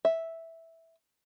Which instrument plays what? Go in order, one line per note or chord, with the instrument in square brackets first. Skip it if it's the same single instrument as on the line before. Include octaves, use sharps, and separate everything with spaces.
[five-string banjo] E5